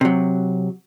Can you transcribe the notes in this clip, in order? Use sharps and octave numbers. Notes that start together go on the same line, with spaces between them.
C3 F#3